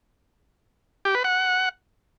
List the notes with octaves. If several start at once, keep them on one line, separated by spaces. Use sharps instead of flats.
G4
B4
F#5